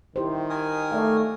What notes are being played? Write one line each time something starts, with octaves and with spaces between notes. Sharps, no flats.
D#3 E4 G4 C5
A#4 G#5 D#6
A3 D5 F5